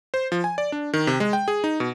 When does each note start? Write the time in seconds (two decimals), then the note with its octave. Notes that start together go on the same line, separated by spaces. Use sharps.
0.14 C5
0.32 F3
0.44 G#5
0.58 D5
0.72 D4
0.93 D#3
1.07 C3
1.20 G#3
1.33 G5
1.48 G#4
1.64 D#4
1.80 B2